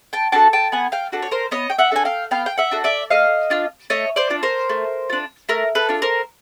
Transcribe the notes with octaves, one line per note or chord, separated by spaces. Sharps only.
G5 A5
D4 F#4 A4 G5 A5
G5 A5
B3 F#5 G#5
F5 G5
D4 F#4 A4
C#5
A#4 C5
B3 C#5 D#5
G5
E5 F#5
D4 F#4 A4 G#5
F5 G5
B3 F5 G5
G5
E5 F#5
D4 F#4 A4
D5 E5
A3 D#5 F5
D4 F4
A3 C#5 D#5
C5 D5
D4 F4
A#4 C5
A3
D4 F4
A3 A#4
A4 B4
D4 F4
A#4 C5